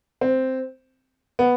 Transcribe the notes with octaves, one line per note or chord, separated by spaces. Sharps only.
C4
B3